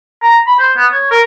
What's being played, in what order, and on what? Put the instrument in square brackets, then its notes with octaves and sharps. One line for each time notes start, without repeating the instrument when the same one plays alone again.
[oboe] A#5
B5
C5
B3
C#5
A#4